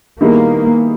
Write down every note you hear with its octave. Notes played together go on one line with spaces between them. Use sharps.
D#3 G3 A#3 B3 E4 G#4